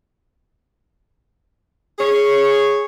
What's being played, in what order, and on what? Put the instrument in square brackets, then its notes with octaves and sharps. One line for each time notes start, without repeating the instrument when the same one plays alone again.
[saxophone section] G#4 C#5